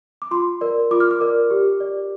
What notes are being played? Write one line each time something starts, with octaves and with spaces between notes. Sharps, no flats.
D6
F4 C6
A#4 D5
F4 D6
F6
D6
A#4 D5
G4
D5